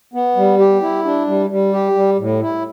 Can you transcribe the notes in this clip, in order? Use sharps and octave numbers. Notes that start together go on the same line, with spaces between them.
B3
G3
G4
E4
D4
G3
G3
G4
G3
A2
E4